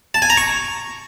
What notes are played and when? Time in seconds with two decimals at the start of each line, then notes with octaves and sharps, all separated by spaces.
0.14 A5
0.22 G#5
0.30 A#5
0.37 C#6